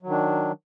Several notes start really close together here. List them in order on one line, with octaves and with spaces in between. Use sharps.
F#3 D#3 D4